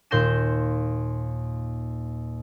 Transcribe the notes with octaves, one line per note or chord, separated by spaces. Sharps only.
D#2 A#2 C6 G6 A#6 E7